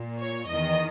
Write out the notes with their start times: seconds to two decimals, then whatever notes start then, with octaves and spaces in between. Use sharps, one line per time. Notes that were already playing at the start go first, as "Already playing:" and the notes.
Already playing: A#2
0.20 C#5
0.48 E2 D#3 D#5